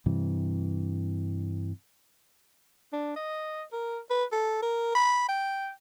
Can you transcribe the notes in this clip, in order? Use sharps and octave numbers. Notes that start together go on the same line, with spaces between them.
G2 C3 E3
D4
D#5
A#4
B4
A4
A#4
B5
G5